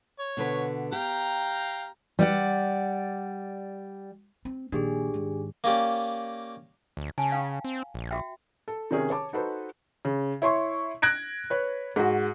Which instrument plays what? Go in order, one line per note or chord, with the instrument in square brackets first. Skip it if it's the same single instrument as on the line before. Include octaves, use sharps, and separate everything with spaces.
[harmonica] C#5
[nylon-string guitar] B2 D3 B4
[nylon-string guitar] G4 [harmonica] F5 G5 A#5
[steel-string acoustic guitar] G3 D5 F#5
[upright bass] C4
[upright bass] A#1 D#3 [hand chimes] D4 G4 G#4
[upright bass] G#2 D#3
[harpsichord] A#3 C#4 G4 D5
[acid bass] D2
[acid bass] C#3 [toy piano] G#5 A5
[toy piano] F5 G5
[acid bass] C4
A#1
[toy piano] F#4 E5 G5
[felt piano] A4
C3 D#3 C#4 G#4
C#5 A5 D6
D#4 F#4 A4 B4 C5
C#3
E4 C#5 C6 C#6
F#6 G#6 A#6 D7
B4 C#5
G#2 F#4